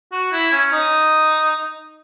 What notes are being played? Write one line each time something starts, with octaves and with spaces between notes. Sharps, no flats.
F#4
E4
C#4
D#4